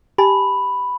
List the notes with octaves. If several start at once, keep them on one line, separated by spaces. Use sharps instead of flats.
G4 G#5 A5 B5